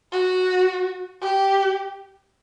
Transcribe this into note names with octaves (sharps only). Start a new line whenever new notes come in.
F#4
G4